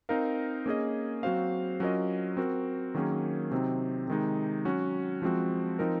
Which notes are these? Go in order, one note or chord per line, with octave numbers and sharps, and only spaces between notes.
C4 D#4 A#4 F5
A#3 C#4 G#4 D#5
F#3 C4 F#4 C5 F5
F#3 C#4 F4 A#4 D#5
C4 F#4 A#4
D#3 F#3 A#3 C#4 G#4
C3 F#3 C4 D#4
C3 D#3 G#3 D#4
F#3 C#4 F#4
F3 G#3 C4 F#4
F3 C4 D#4 A#4